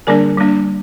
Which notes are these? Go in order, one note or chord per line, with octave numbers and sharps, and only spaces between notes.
D3 G3 A#3 D4 A#4 D5
G3 A#3 D4